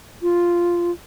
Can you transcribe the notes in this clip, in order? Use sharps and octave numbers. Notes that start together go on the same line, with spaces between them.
F4